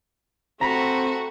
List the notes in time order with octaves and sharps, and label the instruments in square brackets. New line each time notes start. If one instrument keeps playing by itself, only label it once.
[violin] A3 F#4 [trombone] C4 [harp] A#5 B5